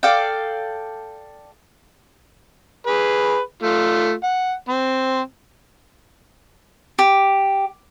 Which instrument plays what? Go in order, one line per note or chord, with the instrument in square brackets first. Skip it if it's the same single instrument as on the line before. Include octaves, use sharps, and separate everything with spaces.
[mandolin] A4 D5 F5 G5
[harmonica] G#4 B4
A3 F4
F#5
C4
[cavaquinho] G4